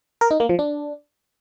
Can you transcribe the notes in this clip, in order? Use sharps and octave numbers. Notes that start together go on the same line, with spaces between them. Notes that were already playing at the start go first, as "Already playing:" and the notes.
A#4
D#4
A#3
F3
D4